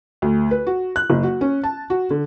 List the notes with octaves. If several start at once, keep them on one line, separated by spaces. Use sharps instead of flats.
D2
B4
F#4
F#6
F#1
F#4
C#4
A5
F#4
D3